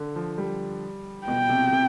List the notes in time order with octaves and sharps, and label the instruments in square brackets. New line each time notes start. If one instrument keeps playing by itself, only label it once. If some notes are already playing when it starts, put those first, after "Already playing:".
Already playing: [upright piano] D3
F3
G3
[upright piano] B2 [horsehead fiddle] G5
[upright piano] C3
C3